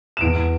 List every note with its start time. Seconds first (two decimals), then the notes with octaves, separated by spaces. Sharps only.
0.17 E7
0.21 E2 D7